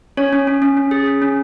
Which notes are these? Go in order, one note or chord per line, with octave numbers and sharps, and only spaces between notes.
C#4 C#5
C#4
C#4
C#4
C#4
G#4
C#4
C#4